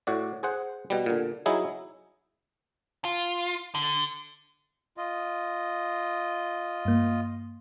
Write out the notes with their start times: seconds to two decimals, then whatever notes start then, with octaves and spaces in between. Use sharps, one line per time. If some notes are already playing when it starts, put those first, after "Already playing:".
0.07 A2 F#4 D5
0.43 G#4 C5 F#5
0.90 B2 G3
1.06 A#2 D3
1.46 F#3 D#4 E4 G#4
3.05 F4
3.75 D3
4.97 F4 D#5
6.85 G2 A#3